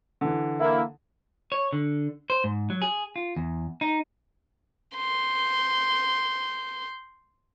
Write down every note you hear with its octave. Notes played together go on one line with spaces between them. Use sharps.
D3 E3
A#3 E4
C#5
D3
C5
G#2
F#3
G#4
F4
E2
D#4
C6 G6